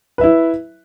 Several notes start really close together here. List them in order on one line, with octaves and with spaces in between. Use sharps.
B4 E5 E4